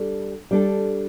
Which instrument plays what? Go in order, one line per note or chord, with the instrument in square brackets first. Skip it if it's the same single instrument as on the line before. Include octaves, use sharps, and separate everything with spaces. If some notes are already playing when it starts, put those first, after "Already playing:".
Already playing: [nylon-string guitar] G3 D4 A4
G3 D4 A4